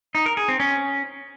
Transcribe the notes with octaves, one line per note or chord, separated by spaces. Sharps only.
D#4
A#4
G#4
C4
C#4